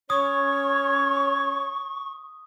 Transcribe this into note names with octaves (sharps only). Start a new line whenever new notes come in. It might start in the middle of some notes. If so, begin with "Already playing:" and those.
C#4 C#5 C#6 D#6